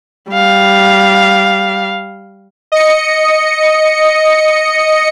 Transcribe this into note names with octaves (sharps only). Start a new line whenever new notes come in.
G3 F5
D#5 C#7